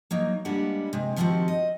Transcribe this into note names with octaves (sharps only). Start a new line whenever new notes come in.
F#3 A#3 D#4
G3 G#3 A#3 B3 D4 F#5
C3 G#3
D#3 F3 C4 D4 F#4 G4
D#5